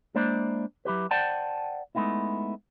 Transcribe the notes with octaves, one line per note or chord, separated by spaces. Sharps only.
G#3 A#3 D4 E4 C5 D5
F#3 E4 G4 B4
C5 D5 F#5 G5 A5
G#3 A3 B3 D#4 E4